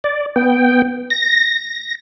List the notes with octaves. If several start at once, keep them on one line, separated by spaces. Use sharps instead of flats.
D5
B3 G5
A#6